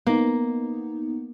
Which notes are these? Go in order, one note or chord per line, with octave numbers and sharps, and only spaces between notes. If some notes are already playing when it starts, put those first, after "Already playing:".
A#3 B3 D#4